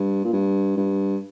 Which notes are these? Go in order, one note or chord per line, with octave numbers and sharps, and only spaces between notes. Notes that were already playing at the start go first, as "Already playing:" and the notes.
Already playing: G2
A#2
G2
G2